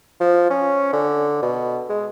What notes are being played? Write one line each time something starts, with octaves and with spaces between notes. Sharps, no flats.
F3
C#4
D3
B2
G#3